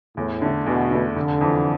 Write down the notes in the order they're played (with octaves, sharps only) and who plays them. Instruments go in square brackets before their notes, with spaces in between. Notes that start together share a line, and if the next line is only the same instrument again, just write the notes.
[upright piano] E2 [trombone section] A2
[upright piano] D3 A3
[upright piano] E2 [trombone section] B2
[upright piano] D3 A3
[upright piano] F1 [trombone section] D3
[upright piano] F2 E3